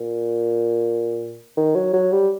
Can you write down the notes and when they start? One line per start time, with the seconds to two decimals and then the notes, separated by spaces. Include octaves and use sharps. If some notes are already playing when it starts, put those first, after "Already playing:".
Already playing: A#2
1.57 D#3
1.75 F#3
1.93 F#3
2.12 G3